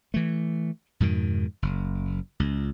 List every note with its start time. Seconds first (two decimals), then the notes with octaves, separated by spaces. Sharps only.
0.14 E3 A3
1.00 F2 G#2 B2 D#3
1.62 F#1
2.40 C#2